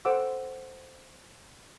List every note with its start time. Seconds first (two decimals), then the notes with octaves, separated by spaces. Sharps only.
0.05 A4 C5 F#5 D6 E6